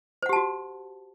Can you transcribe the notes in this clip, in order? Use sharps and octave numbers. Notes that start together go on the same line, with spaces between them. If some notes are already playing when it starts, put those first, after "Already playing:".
F#4 G4 C5 F#5 A5